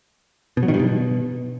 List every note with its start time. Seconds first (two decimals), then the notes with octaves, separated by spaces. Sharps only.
0.57 B2
0.63 F#3
0.68 D#3
0.74 G2
0.79 B2